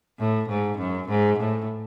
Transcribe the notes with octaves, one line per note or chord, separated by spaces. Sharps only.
A2
G#2
F#2
G#2
A2